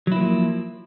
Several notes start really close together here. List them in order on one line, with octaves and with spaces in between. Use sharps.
F#3 E4 A#3 F3